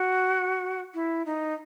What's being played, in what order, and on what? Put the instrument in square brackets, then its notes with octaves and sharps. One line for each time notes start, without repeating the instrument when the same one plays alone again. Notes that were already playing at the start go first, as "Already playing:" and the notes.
Already playing: [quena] F#4
E4
D#4